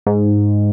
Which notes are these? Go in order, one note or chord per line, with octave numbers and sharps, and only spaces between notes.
G#2